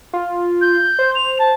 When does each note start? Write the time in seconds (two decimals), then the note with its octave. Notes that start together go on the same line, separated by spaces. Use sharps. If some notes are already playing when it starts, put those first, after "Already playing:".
0.13 F4
0.61 G6
0.99 C5
1.15 F7
1.39 A5